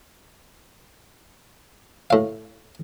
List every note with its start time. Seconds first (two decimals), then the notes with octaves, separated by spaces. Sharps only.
2.10 A2 F5